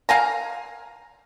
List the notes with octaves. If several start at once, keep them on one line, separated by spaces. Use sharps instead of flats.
F5 G#5 A#5